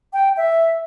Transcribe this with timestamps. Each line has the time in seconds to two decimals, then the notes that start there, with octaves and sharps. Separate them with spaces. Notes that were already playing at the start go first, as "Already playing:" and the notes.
0.13 G5
0.37 E5